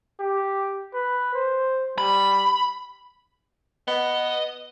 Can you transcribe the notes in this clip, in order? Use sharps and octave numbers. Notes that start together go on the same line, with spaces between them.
G4
B4
C5
G3 B5
B3 D#5